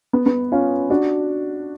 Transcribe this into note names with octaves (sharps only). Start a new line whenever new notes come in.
B3
B3
C#4 F4
D4 F#4